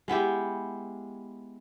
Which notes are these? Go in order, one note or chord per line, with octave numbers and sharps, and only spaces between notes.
G#3 B3 E4 G4